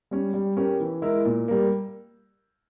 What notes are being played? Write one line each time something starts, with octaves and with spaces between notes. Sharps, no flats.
G3 C#4
G3
C#4 G4 A#4
E3
G#3 E4 A#4
A#2
G3 A#3